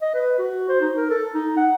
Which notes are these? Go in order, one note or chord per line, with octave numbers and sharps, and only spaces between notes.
D#5
B4
F#4
C5
D#4
A#4
A4
D#4
F#5